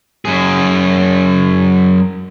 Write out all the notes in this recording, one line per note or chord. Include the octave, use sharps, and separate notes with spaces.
F#2 G#4